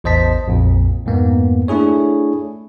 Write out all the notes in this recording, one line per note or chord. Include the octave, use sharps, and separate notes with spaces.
A1 E2 C5 D#5 A5 B6
A#1 F2 A#2
F2 G#2 A#3 B3
A3 D4 E4 G#4 C#5